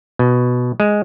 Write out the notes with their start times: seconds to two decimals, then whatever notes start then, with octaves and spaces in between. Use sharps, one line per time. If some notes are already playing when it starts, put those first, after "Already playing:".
0.19 B2
0.80 G#3